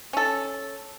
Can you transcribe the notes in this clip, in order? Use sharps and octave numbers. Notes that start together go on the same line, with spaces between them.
C#4 A4